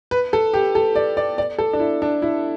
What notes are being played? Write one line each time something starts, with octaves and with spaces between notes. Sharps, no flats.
B4
A4
G4
A4
D5
D5
D5
A4
D4
E4
D4
E4